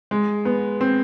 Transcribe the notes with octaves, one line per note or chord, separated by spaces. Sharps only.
G#3
B3
C4